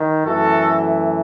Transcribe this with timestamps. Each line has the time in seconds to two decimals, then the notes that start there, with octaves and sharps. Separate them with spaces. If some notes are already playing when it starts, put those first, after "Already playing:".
Already playing: D#3
0.25 F#2 E3 A3 F#4 A4